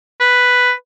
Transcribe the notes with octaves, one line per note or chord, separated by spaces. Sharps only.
B4